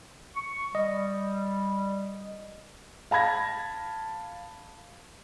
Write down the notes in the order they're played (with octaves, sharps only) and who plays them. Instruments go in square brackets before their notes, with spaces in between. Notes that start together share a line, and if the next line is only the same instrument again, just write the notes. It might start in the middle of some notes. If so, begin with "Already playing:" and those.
[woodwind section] C#6
[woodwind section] G3 [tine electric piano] D#5
[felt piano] F5 A5 B5 G#6 A#6